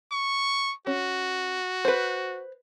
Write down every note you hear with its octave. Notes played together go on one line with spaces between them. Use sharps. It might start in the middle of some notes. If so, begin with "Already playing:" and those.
C#6
C#4 F#4
B4 C5